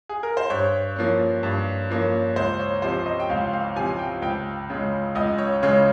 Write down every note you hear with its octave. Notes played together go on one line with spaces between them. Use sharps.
G#4
A#4
C5
G2 C#5
F3 A#3 C#4
G2
F3 A#3 C#4
C#2 C5
C#5
C3 F3 C5
D#5
G5
C#2 F5
F5
C3 F3 G#5
G5
C#2 G5
C#3 G#3
C#2 D#5
C#5
C#3 G#3 C#5